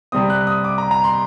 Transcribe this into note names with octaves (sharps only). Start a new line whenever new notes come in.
C3 G3 C4 D#6
F#6
D#6
D6
A#5
A#5
C6